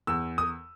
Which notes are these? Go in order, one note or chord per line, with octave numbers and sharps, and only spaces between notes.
E2 E6
D#6